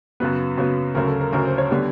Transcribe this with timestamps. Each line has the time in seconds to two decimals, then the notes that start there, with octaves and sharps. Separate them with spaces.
0.20 F#2 C#3 F#3 B3 B4
0.58 F#2 C#3 F#3 B3
0.95 D2 C#3 F#3 A#4
1.07 A4
1.21 A#4
1.32 D2 C#3 F#3 A#4
1.45 C5
1.58 C#5
1.71 D3 G3 B3